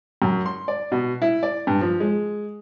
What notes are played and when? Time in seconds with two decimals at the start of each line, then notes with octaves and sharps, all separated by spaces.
0.22 F#2
0.46 C6
0.68 D5
0.92 B2
1.22 E4
1.43 D5
1.67 G2
1.81 F3
2.00 G#3